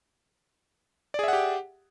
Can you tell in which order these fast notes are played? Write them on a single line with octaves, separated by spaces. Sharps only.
D5 G#4 E5 F#5 G4